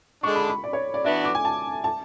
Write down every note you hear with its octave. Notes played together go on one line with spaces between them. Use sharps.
D3 G#3 D4 C#6
B5
B5
D5
C#5
D5
E3 B3 D4 F#4 E5
D6
G#5
A5
A5